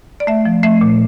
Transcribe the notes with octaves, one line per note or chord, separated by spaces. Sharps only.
D5
A3 E5
F3
A3 E5
A#2